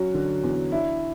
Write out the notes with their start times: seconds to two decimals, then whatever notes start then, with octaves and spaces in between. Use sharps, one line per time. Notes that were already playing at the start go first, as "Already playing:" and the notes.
Already playing: F#3 C#4 F#4
0.14 D3
0.43 E2
0.72 D4 E4